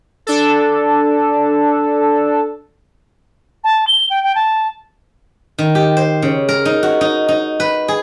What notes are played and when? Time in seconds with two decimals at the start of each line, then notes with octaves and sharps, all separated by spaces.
0.27 D4 A4
3.64 A5
3.87 G7
4.10 G5
4.24 G5
4.35 A5
5.58 D#3
5.75 G4
5.97 C5
6.22 C#3
6.49 A#4
6.65 D#4
6.83 F#4
7.01 D#4
7.28 D#4
7.60 B4
7.88 G#4